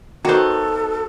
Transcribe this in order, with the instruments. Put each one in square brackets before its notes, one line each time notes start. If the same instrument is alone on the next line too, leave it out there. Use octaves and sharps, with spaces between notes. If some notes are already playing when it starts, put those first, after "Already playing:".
[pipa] D#3 B3 [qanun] F#4 C5 [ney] A4